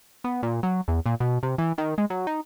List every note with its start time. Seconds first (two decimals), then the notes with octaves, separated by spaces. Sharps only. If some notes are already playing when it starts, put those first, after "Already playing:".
0.24 B3
0.43 A#2
0.63 F#3
0.88 E2
1.06 A#2
1.20 B2
1.43 C3
1.58 E3
1.78 D#3
1.98 G#3
2.10 F#3
2.27 D#4